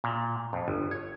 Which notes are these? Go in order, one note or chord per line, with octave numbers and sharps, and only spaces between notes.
A#2
F2
G1
C#5